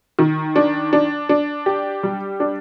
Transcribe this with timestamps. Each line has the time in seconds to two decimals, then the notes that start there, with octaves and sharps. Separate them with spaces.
0.19 D#3
0.56 D4
0.93 D4
1.29 D4
1.66 G4
2.03 G3
2.40 D4